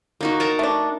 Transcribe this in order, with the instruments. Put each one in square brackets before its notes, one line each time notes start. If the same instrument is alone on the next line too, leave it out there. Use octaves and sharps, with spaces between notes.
[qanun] A#3 D#4 F#4
A#4 A5 A#5
[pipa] A3 D4